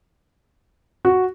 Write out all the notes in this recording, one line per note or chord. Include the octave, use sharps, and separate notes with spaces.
F#4